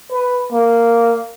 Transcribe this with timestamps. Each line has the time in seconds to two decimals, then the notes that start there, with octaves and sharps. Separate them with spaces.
0.11 B4
0.53 A#3